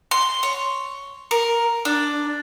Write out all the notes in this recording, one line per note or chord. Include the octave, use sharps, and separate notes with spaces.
C6
C#5
A#4
D4